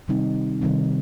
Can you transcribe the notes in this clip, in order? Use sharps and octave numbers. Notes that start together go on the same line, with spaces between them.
C3 D#3 G3 C4 D#4
C3 D#3 G3 C4 D#4